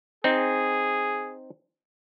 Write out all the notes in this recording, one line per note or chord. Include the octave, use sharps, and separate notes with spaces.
C4 D#4 G#4